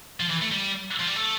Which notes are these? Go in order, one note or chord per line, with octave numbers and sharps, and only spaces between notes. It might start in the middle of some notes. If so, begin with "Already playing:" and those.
F3
E3
A3
G3
F3
G3
A3